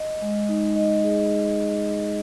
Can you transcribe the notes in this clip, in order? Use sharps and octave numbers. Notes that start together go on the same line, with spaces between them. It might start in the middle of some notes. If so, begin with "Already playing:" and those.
Already playing: D#5
G#3
D#4
D#5
G#4